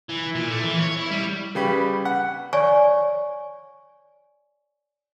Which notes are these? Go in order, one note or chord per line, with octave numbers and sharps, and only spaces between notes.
E3
A#2
A3
E3
C#5
E4
G3
C#3 G3 B4
F#5
C#5 D5 G#5 C#6